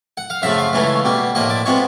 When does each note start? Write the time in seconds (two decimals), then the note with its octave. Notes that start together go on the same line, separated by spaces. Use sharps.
0.17 F#5
0.30 F5
0.42 F#2 C#3 F3 A3 E5
0.59 F5
0.73 C#2 C#3 E3 A3 C#4
1.04 B2 G3 A#3
1.35 A2 F3 A#3 D#5
1.50 D5
1.66 C3 F3 G#3 B3 C#5